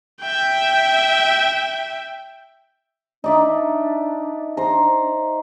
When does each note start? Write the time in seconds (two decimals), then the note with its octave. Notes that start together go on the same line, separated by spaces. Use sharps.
0.21 E5 G5
3.24 D4 D#4 D5 E5
4.57 C5 A#5